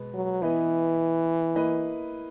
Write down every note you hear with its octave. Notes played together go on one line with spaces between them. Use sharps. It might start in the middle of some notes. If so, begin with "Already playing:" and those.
Already playing: B2 G#3 B3
F#3
E3 B3 E4 B4 D#5
A#3 E4 B4 D#5